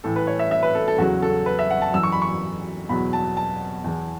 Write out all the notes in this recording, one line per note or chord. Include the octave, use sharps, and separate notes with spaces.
A2 E3 A4
B4
C#5
E5
E5
B4
A4
A4
E2 C#3 F#3 F#4
A4
B4
E5
F#5
A5
F#2 E3 E6
C#6
B5
C#6
E2 B2 F#3 B5
A5
A5
E2 E3